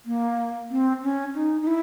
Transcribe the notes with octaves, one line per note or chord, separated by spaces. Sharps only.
A#3
C4
C#4
D#4
D#4
E4